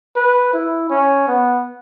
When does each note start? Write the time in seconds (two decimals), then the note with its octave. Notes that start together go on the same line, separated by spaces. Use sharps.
0.16 B4
0.53 E4
0.90 C#4
1.28 B3